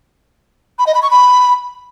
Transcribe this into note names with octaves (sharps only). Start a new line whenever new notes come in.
B5
D#5
B5
C#6
B5